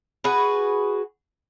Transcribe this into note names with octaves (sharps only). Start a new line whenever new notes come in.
F#4 G#4 B4